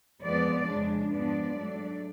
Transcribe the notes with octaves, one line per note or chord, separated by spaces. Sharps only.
F2 F3 G#3 B3 D5
F2 C#3 G#3 D4
G#2 F3 B3 D4 D5
G#2 F#3 A3 D4